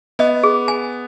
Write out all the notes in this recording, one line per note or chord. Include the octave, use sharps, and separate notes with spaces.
B3 D#5
G#4
G#5